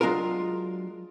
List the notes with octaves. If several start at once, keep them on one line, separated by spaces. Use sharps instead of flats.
F#3 G#3 D4 F4 A#4